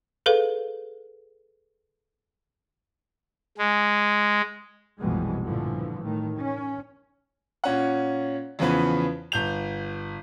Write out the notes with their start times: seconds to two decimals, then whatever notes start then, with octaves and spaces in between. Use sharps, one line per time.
0.26 G#4 A4 B4 F5
3.58 G#3
4.99 A#1 F2 B2 E3 G3 G#3
5.43 G2 A#2 D3 E3 F3
6.00 A2 D#3 A3
6.36 C#4
7.64 A#2 C#4 F#5
8.59 E2 C#3 F3 B3 B4
9.32 G1 G6 F7